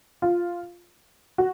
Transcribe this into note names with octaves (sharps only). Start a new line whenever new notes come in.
F4
F#4